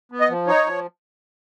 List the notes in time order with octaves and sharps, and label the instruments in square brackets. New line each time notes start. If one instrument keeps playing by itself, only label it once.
[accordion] B3
D#5
F3
D#4 C#5
F3